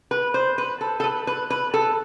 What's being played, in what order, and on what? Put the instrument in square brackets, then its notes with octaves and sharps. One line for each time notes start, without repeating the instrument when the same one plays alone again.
[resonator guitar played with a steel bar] B4
C5
B4
A4
A4
B4
B4
B4
A4